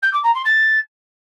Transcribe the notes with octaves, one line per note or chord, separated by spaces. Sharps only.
G6
D6
A#5
C6
A6